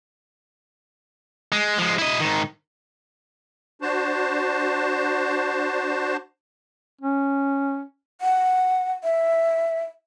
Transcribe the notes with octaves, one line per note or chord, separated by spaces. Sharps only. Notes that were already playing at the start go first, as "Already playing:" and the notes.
G#3
F3 G#3
E4 D#5
G#2 D#3
D4 F#4 C5 A5
C#4
F#5
E5